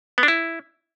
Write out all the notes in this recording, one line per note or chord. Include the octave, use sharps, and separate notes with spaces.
B3
D4
E4